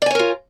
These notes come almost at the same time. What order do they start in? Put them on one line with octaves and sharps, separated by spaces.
D5 G#5 C#5 A#4 F4